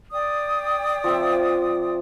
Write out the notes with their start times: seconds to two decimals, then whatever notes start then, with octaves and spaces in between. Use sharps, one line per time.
0.12 D5 G5 D#6
1.04 F3 C4 E5